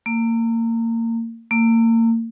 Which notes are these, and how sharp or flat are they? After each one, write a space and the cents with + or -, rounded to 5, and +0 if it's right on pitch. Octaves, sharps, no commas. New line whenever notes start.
A#3 -30
A#3 -35